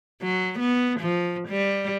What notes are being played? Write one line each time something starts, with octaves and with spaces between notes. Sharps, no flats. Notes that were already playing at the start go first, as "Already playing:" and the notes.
F#3
B3
F3
G3